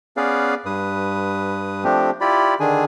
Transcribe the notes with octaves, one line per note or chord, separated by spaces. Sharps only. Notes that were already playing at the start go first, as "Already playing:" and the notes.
B3 C#4 G#4 B4 D5 F5
G2 B4 D#6
F3 A3 C4 D4 G4
E4 F4 G4 D5 B5
D3 D#3 D4 G#4 G#5